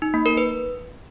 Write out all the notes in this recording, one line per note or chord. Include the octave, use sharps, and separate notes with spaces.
D#4
A#3
A#4
B4